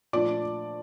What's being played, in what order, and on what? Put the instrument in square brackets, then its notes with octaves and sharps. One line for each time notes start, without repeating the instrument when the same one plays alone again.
[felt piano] A#2 F3 A3 D4 D5 D6